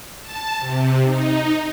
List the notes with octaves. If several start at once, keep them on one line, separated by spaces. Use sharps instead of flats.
A5
C3
D#4